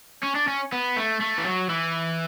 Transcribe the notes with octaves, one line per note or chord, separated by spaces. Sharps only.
C#4
D4
C#4
B3
A3
A3
E3
F#3
E3